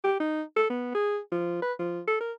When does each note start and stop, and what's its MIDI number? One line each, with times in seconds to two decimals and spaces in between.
0.04 0.18 67
0.20 0.42 63
0.56 0.68 69
0.70 0.90 59
0.95 1.19 68
1.32 1.59 53
1.62 1.72 71
1.79 2.00 53
2.07 2.18 69
2.20 2.32 70